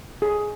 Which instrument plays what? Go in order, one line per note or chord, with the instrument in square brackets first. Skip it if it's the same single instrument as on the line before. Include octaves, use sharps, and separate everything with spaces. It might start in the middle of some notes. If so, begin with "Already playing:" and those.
[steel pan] G#4